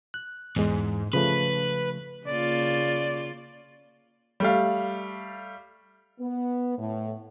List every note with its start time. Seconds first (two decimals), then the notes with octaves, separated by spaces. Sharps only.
0.14 F#6
0.56 E2 G#2 G#3
1.13 C#3 F3 A3 B4
2.27 C#3 A#3 F4 D5
4.40 G3 A3 F5
6.20 B3
6.78 A2